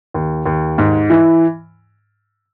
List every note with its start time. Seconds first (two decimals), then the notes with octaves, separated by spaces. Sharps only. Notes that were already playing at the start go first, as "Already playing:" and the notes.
0.14 D#2
0.46 D#2
0.78 G#2
1.10 E3